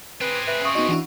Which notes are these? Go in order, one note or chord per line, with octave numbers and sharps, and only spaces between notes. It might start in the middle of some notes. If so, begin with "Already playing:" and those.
C4 G#4 B4
D6
B4 E5
C#4 E5 F5 C#6 D#6
B3 D#4 F#4 D#5
E3 D4 E4 F#5 G#5 B5